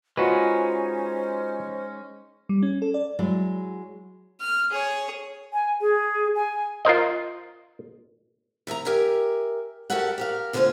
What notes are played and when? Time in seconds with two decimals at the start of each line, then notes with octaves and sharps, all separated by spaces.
0.17 G#3 C#4 D#4 F4 F#4 B4 C5
2.49 G3
2.63 C#4
2.82 A4
2.94 D5
3.19 F#3 G#3 E4 D5
4.40 F6
4.71 G#4 C#5
5.53 G#5
5.81 G#4
6.35 G#5
6.85 F4 A#4 C5 D#5
8.67 D#3 E5 G#5 A#5
8.85 G4 A#4 E5 G#5
9.90 F#4 G4 A4 A#4 E5 F#5
10.18 G4 A#4 F5
10.53 D2 D3 F4 G4 C5 G#5